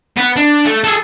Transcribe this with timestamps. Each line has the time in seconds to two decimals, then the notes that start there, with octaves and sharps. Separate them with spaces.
0.17 B3 B4
0.36 D4
0.65 A3
0.84 G#4 A4